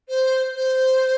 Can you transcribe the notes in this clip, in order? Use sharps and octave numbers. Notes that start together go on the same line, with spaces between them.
C5
C5